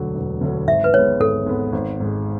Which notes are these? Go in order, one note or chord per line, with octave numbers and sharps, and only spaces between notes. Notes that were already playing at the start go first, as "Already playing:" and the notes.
Already playing: E1 D2 D3 F#3
E1
D2 D3 F#3
G#1 E5
B4
G#2 G#3 B3 C#5
G#1 A4
G#2 G#3 B3
G#1
G#2 G#3